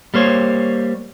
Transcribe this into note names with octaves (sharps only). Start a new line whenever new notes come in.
G3 A#3 C5 C#5